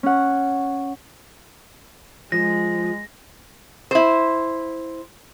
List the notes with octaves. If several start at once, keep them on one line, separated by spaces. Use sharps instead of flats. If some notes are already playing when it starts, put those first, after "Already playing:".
C#4 F#5
F3 G#3 A#6
E4 C5